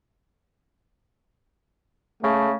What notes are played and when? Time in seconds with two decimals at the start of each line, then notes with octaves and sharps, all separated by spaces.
2.23 C#3 A3